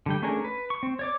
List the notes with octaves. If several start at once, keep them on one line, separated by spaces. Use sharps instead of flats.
D3 G3 G5
A3 C#4 D4 G#4 A#4
B4
C#6
C4
C#5 D5 D6